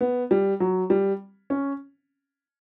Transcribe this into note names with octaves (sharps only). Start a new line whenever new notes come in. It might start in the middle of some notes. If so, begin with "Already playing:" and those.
B3
G3
F#3
G3
C#4